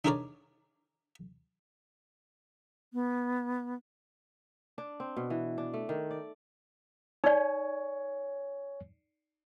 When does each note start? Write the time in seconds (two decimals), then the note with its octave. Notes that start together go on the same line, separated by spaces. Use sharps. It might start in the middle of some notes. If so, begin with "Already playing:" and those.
0.05 D4 D#4 G#4 A#4 C#5 D5
2.93 B3
4.78 D4
5.00 C4
5.17 B2
5.30 E3
5.58 D4
5.74 A3
5.89 D#3
6.11 D5
7.24 D#4 C#5 D5 G#5